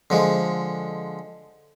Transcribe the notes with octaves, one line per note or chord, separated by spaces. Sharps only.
D3 F3 G#3